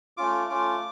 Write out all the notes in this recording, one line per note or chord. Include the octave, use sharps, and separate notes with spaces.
A3 C#4 F4 D6
A3 C#4 F4 D6